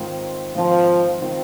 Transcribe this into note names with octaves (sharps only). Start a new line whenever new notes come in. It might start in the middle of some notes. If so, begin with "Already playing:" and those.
Already playing: G#2 D#3 C4 F4
G#2 D#3 F3 C4 F4
D#3 C4 F4